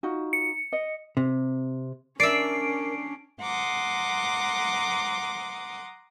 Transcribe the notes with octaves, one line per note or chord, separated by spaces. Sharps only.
D#4 F4 F#4
C#7
D#5
C3
C#4 D4 A#4 D5 E5 C7 D7
F#5 A#5 C6 D6 D#6